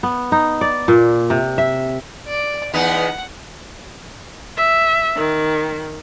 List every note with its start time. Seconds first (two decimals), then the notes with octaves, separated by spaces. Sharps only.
0.03 B3
0.32 D#4
0.61 D5
0.88 A#2
1.30 C3
1.58 E5
2.28 D5
2.74 E2 B3 D#4 F#5
4.57 E5
5.16 D#3